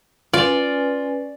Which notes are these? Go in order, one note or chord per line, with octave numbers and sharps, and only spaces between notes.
C#4 F4 B4 D5 G#5